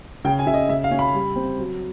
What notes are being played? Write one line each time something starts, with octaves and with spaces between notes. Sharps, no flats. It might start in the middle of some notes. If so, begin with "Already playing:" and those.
C#3 G5
G#5
C#3 E5
D#5
C#3 E5
F5
C#4
B5
G3
C4
F#3